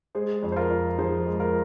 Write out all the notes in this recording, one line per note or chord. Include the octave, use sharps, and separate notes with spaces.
G#3 G#4 C5
F2
C5
F4 A#4
F2
F3 G#4 C5
G#3
F4 A#4